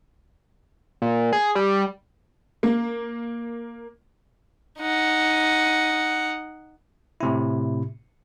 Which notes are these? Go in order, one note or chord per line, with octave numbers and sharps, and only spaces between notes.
A#2
G#4
G3
A#3
D#4 F#5
A2 C3 E4